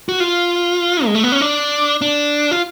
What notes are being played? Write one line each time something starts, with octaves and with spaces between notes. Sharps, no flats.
F#4
F4
G#3
A3
B3
C#4
D4
D4
F4